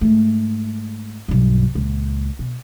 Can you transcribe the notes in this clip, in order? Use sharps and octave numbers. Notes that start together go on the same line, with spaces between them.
G#2 A3
B1 G2
C#2 A#2
B2